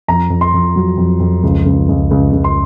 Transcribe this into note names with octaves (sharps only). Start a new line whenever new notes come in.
F2 A#5
F2
C6
F2
F#3
F2
F2
C#2
C#2
C#2
C#2
C#2
C6